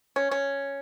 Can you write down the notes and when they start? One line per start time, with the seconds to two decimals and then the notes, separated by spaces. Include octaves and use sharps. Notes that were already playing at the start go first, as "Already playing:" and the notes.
0.16 C#4
0.31 C#4